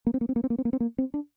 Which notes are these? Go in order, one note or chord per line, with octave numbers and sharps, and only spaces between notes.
A#3
C4
A#3
C4
A#3
C4
A#3
C4
A#3
C4
A#3
C4
D4